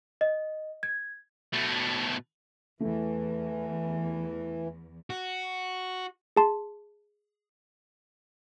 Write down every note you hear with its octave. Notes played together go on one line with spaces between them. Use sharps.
D#5
G#6
B2 A3
E2 E3 A3
F#4
G#4 A5 C6